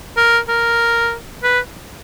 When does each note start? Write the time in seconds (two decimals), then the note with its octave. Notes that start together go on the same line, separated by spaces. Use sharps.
0.17 A#4
0.49 A#4
1.43 B4